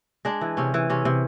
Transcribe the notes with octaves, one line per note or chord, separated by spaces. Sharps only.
G#3 D4
E3
C3 C#4
E3
C3 C#4
C3